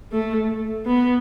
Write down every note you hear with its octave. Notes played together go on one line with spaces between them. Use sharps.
A3
B3